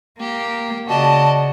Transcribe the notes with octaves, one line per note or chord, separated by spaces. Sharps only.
A#3 G4
C#3 F#4 D5 D#5 A5